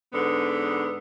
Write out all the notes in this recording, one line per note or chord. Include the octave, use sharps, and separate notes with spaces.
G#2 D3 B3